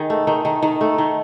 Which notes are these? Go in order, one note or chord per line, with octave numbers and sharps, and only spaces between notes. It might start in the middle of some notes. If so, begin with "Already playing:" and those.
Already playing: D#3 G#4
A3
D#3
D#3
D#3
A3
D#3